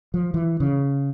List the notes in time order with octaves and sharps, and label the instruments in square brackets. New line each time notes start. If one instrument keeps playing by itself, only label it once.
[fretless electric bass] F3
E3
C#3